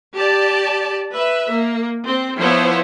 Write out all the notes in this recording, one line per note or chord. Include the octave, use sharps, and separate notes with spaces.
G4 D5 A5
B4 E5
A#3
C4
F3 B3 E4 C5 C#5